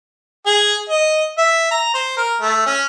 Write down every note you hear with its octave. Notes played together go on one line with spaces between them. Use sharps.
G#4
D#5
E5
A#5
C5
A#4
A3
C#4